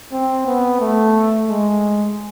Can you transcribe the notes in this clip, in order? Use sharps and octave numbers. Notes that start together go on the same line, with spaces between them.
C4
B3
A3
G#3